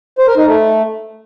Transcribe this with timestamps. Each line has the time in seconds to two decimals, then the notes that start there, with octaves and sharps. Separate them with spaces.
0.18 C5
0.28 A#4
0.37 D#4
0.46 A3